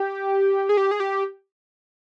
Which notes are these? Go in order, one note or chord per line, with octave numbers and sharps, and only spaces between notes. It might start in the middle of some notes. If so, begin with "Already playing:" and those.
Already playing: G4
G#4
G4
G#4
G4